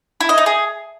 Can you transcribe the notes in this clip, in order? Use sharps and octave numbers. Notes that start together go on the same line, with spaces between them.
E4
D#5
D#4
G#4